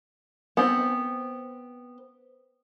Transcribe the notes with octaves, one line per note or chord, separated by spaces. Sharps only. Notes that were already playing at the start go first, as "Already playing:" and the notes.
B3 C4